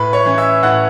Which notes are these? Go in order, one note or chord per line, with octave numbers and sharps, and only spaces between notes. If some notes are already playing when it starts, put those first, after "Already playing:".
Already playing: A2 B4 B5
C#5 C#6
E3 C#4
E5 E6
A2 F#5 F#6